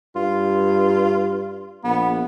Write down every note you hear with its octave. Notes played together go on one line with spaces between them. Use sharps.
G2 F4
A#1 B3